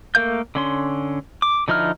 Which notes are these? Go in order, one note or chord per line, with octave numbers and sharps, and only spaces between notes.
A3 A#3 A#4 F5 G6
D3 C#4 C6
D6
D3 F3 D#4 E4 F6